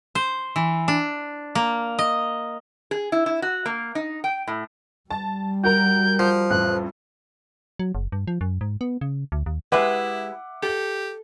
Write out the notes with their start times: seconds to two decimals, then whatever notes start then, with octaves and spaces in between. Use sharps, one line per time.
0.15 C5
0.56 E3
0.88 D4
1.55 A#3
1.99 D#5
2.91 G#4
3.12 E4
3.26 E4
3.42 F#4
3.66 A#3
3.95 D#4
4.24 G5
4.48 A2
5.10 G3 A5
5.64 F#4 A#4 A#5 G6
6.19 F3
6.50 A1 F2 F#6
7.79 F#3
7.95 F#1
8.12 G2
8.28 F3
8.41 F#2
8.61 G#2
8.81 B3
9.01 C#3
9.32 D2
9.46 D#2
9.72 G#3 E4 G4 B4 E5 F#5 D6
10.62 G4 A4